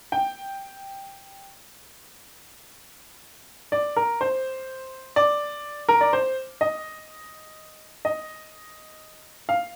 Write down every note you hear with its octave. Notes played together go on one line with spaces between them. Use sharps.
G5
D5
A#4
C5
D5
A#4
D5
C5
D#5
D#5
F5